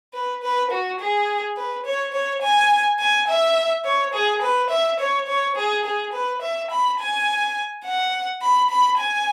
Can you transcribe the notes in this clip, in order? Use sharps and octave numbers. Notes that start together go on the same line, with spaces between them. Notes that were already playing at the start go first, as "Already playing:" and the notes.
B4
B4
F#4
G#4
B4
C#5
C#5
G#5
G#5
E5
C#5
G#4
B4
E5
C#5
C#5
G#4
G#4
B4
E5
B5
G#5
F#5
B5
B5
G#5